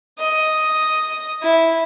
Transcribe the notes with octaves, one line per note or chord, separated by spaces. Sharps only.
D#5
E4